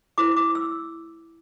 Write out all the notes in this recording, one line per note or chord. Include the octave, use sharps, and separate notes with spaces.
E4 C5 D6
D6
E6